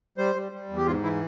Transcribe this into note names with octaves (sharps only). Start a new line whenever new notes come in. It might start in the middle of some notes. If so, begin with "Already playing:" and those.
G3 C5
G3
G3
E2
G4
G#2 F4
E3 E4